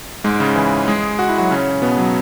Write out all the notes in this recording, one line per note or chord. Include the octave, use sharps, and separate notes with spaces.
G#2 G#3
C#3 C#4
E3 E4
G#3 G#4
F#4
E4
F#3 F#4
C#3 C#4
B2 B3
F#3